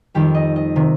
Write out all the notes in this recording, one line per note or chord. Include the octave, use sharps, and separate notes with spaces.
F2 D#3 G3 G4
D#5
D#5
C3 D#3